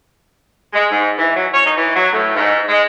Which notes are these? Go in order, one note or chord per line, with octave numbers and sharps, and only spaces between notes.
G#3
G#2
E3
F#3
C#5
D#4
E3
F#3
A2
G#2
G#3